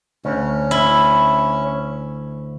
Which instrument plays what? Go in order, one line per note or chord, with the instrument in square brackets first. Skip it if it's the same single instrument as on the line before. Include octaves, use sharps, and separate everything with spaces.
[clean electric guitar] D2 [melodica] C#4
[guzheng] E4